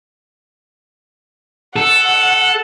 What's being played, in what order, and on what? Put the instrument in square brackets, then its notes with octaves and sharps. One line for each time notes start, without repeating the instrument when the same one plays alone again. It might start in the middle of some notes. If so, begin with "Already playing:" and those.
[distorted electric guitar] A4 [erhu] F#5